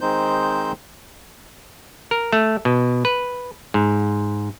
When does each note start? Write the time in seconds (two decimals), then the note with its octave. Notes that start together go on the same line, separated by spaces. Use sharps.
0.01 D#3 G#3 C4 D#4 C5 G6
2.11 A#4
2.33 A3
2.65 B2
3.05 B4
3.74 G#2